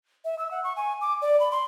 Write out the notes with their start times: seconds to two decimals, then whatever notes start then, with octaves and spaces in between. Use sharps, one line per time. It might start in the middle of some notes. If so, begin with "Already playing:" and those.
0.25 E5
0.39 E6
0.51 F#5
0.64 C#6
0.76 G#5
1.01 D6
1.22 D5
1.40 B5
1.51 C6